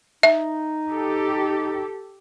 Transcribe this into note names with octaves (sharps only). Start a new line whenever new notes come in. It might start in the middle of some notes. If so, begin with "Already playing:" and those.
D#4 E5
G4 A4